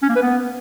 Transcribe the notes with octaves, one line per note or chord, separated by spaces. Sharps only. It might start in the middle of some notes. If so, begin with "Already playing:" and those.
C#4
A#3
B4
B3